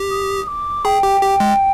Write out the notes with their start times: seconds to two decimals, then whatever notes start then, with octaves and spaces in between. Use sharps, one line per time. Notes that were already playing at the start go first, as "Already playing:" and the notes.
Already playing: G4
0.11 D#6
0.47 D6
0.85 G#4 G5
1.03 G4
1.22 G4
1.40 G#3